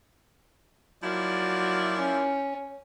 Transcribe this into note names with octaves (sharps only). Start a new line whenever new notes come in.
F3 F#3 A#3 E4 D5
C#4